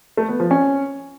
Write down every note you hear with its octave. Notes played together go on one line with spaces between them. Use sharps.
A3
B3
F3
C#4